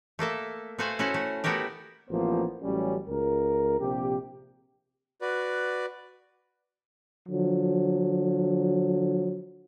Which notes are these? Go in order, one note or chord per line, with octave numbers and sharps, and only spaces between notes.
A3 A#3 A4 E5
A3 F#4 B4 C5 F5 G#5
C#4 E4 F#4 A4 C5
A3
A3 B3 E4 F#4 G4 A#4
A1 F3 A#3 B3 C5
A1 F#3 G3 C#4
C#2 A#4
A#1 C3 G4
F#4 B4 D5
D3 F3 F#3